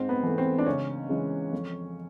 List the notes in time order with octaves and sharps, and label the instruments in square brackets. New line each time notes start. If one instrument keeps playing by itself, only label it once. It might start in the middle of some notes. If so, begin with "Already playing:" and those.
Already playing: [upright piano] G#2 C4
B3
E3 A3
C4
D4
C#2 C#4
C#3 E3 G#3
F2